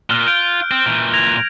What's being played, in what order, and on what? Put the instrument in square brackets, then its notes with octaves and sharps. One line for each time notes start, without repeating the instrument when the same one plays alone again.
[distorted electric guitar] A#2 [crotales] F6 F#6 G7
[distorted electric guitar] F4 [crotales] G6 D7
[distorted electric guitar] C4
A#2 E3
[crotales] G#6 A#6 F7